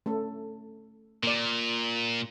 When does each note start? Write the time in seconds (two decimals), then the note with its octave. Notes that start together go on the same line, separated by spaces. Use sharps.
0.06 A3 C#4 A4
1.23 A#2 A#3 D5